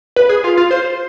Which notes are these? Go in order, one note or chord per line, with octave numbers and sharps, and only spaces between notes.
B4
G#4
F4
F4
C5